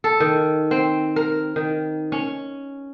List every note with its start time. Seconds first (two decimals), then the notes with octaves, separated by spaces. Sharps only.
0.04 A4
0.20 D#3
0.71 C4
1.16 A#4
1.56 D#3
2.12 C#4